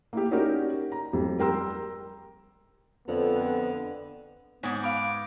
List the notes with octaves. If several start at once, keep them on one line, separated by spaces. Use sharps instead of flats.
A#3 E4 G4
C#4 D#4 F#4 G4 A#4 D5
A#5
F2 F#3 G3
G3 A#4 G5 A#5 C6 E6
F2 D3 B3
G#2 B3 C#5 G#5 D6
B4 F5 D6